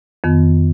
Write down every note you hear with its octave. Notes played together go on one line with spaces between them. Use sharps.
F2 D#3 B3